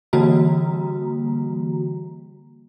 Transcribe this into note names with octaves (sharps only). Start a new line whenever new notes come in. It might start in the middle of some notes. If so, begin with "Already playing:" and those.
D3 E3 G3 A#3 F#4 A#5